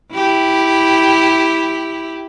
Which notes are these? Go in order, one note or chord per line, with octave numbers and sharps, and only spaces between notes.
E4 G4